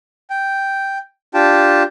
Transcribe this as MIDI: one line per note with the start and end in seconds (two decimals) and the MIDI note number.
0.30 0.98 79
1.34 1.83 62
1.34 1.83 65
1.34 1.83 67
1.34 1.83 79
1.34 1.83 81